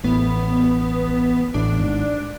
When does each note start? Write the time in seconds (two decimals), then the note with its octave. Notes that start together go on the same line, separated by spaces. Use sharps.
0.04 A1 A2 B3
1.54 A1 A2 D4
1.80 G#1 G#2